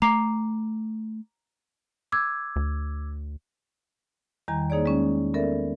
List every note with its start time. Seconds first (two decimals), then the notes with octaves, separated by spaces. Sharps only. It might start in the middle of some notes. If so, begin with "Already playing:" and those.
0.02 A3 A#5 D6 C7
2.12 D6 E6 G#6
2.56 D2
4.48 E2 D#3 G3 G5 A#5
4.70 A#3 D#4 G#4 C#5 D5
4.86 G#3 C#4
5.34 B3 C#4 A4 A#4 D5 E5